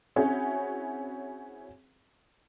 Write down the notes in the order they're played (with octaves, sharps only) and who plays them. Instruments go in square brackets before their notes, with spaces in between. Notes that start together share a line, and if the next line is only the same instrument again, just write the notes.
[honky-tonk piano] C4 C#4 E4 F#4 G#4 C#5